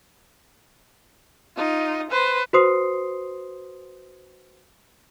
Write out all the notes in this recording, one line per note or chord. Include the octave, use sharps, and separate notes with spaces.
D#4 F4
B4 C5
F#4 B4 C5 C6 D#6 C7